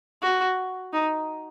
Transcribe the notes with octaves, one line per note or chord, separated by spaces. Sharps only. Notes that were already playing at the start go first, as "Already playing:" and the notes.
F#4
D#4